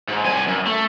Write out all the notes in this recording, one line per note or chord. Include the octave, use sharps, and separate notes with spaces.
G#2
C2 G#5
F#2
A3